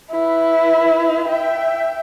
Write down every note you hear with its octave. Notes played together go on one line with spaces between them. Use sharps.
E4 B4
E5 G5